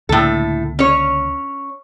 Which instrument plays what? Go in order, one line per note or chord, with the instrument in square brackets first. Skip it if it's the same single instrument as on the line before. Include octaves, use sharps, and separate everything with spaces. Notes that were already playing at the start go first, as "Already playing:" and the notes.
[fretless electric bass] C#2 D3 A#3 [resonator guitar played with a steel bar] A2 A4
[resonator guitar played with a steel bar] C#4 C#5